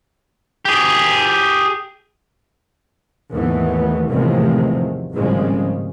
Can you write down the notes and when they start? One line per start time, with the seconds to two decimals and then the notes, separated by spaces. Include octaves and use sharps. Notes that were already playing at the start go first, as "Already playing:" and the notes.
0.65 G4 G#4
3.33 D#2 G#2 E3 A3 B3
4.10 E2 A2 C3 D#3 F3 G#3
5.13 G#1 A2 C#3 F3 G3 G#3